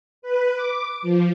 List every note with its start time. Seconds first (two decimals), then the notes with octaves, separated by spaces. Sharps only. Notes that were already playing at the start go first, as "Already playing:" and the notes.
0.22 B4
0.55 D6
1.02 F3